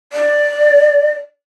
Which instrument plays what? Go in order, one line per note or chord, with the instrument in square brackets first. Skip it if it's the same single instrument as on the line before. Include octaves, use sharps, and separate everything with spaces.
[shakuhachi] D5